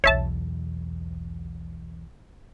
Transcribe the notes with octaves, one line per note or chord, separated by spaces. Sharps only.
B1 E2 C#5 E5 A5